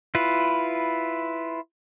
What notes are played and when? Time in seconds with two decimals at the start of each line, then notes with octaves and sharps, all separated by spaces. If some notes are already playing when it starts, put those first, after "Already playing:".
0.15 E4 F4 B4